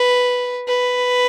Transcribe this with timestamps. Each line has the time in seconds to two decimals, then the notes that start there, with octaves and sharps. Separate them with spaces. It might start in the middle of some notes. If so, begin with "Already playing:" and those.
Already playing: B4
0.68 B4